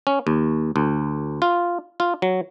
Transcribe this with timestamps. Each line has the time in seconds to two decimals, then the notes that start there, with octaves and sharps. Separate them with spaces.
0.07 C#4
0.27 D#2
0.76 D2
1.42 F4
2.00 F4
2.22 F#3